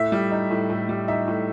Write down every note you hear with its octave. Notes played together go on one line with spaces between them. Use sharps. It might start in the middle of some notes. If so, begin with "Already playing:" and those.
Already playing: A2 E5
G3
D#4
A2
A2
G3
D#4 E5
A2